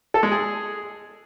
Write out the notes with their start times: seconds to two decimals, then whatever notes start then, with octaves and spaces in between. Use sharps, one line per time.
0.14 A4
0.23 G#3
0.32 G#4